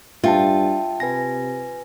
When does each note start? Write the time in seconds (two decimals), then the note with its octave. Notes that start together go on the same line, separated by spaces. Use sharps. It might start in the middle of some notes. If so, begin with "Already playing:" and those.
0.24 G2 F4 E5 G5 A5
1.00 C3 B4 G#5 A#6